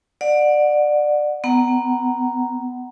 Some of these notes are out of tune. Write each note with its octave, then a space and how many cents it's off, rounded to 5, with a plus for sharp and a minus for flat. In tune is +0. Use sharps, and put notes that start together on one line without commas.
D5 +20 F#5 -15
B3 +20 F#5 +20 A#5 +0